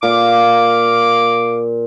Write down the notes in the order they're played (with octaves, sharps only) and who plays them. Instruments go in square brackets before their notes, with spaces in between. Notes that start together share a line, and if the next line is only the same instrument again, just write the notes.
[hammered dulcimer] A#2 [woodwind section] F5 D6